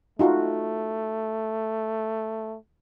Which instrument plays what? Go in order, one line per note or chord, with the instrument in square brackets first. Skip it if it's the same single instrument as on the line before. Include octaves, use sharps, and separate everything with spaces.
[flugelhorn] A3 [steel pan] D#4 F4 F#4